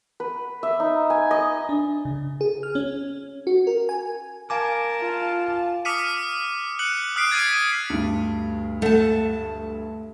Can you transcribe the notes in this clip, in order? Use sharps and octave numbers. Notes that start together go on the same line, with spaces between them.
B4
E5
D#4
G#5
D#5
D4
C#3
G#4
F6
C#4
F#4
A#4
G#5
A#4 F5 G#5 A5 D6
F4
D6 D#6 F6 B6 C#7 D#7
F#6 C#7 F#7
D#6 F6 F#6 B6 C7 D7
G#6 A6 B6 D7 D#7
D2 G2
A3 A4 E5 F#5 A5